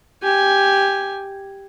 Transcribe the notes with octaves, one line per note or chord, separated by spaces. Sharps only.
G4 G#5